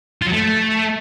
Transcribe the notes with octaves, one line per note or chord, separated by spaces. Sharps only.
F4
F#3
A3